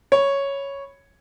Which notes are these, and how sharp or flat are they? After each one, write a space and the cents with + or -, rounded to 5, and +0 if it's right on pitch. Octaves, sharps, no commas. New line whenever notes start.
C#5 +0 B5 +0